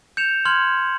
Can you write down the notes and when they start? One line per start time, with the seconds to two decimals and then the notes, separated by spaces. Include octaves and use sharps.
0.17 G6 C#7 E7 F7
0.45 C6 F6 G#6 F#7